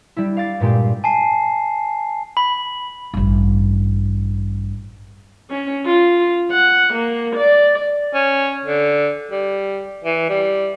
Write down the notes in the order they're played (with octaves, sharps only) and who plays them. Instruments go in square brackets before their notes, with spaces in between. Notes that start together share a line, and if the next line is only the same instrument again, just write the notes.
[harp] G3 D4 E4
F5 D6 A6 C7
G2 A#2 G#3 G4
[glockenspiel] G#5 A5 C7
[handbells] B5
[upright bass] A1 G2
[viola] C#4
F4
F#5
A#3
D5
[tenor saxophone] C#4
D3
G3
E3
G3